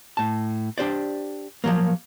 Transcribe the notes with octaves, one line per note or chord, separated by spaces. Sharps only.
A2 A5
D4 G4 C5 D5
F3 F#3 A#3